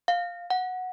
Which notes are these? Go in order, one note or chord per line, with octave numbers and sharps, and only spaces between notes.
F5
F#5